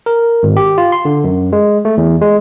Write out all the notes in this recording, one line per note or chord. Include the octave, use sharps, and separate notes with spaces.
A#4
G#1
G4
F4
C6
D3
F#2
G#3
A3
E2
G#3